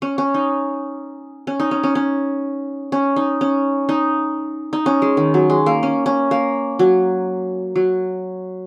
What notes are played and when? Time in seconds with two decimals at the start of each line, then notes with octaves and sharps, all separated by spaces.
0.02 C#4
0.18 C#4
0.34 D#4
1.47 C#4
1.60 D#4
1.71 C#4
1.83 C#4
1.95 C#4
2.92 C#4
3.16 D#4
3.41 C#4
3.89 D#4
4.73 D#4
4.86 C#4
5.02 G#3
5.17 D#3
5.34 F#3
5.50 G#3
5.66 A#3
5.83 C#4
6.06 C#4
6.31 A#3
6.79 F#3
7.76 F#3